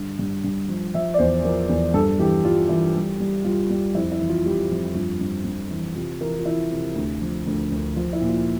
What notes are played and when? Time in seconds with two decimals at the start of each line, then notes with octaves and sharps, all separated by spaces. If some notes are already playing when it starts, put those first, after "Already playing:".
Already playing: G2 D3
0.19 G2
0.44 G2
0.69 F3
0.94 F3 E5
1.14 D5
1.19 E2 C5
1.45 F3 A#4
1.69 E2
1.94 G2 A4
2.19 E3 G4
2.45 G3 F4
2.69 E3 E4
2.95 G3
3.20 G3
3.44 G3 F4
3.70 G3
3.95 F2 E4
4.12 E4
4.20 E3
4.29 F4
4.45 G3 G4
4.70 F2
4.95 G2 F4
5.21 G2
5.45 G2
5.71 E3
5.95 C3 F4
6.21 E3 A#4
6.39 F4
6.45 E3 E4
6.71 C3
6.95 D2
7.22 F3
7.46 D2
7.71 D2
7.96 F3 F4
8.13 E4
8.21 A#2
8.29 F4